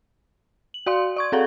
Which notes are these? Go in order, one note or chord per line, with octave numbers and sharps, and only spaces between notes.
F#7
F#4 D5 F5 C6
D5 C#6 G#6
C4 F#4 G#4 A4 F5 F#5